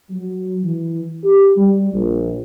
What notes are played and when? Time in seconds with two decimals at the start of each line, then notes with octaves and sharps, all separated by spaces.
0.11 F#3
0.64 E3
1.24 G4
1.56 G3
1.94 A#1